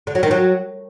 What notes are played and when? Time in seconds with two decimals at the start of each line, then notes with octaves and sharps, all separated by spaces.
0.07 D3
0.15 F#3
0.23 D#3
0.31 F#3